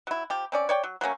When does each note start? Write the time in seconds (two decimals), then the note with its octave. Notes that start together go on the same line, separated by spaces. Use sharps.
0.07 F#3 E4
0.30 F3 G4
0.52 C4 C#4 D5
0.69 C#5 D5 G5
0.83 F#3
1.01 F#3 A3 A#3 C#4